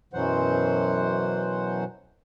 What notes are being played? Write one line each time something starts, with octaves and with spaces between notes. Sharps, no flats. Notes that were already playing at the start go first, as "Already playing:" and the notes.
F#2 B2 E3 F#3 C5 F#5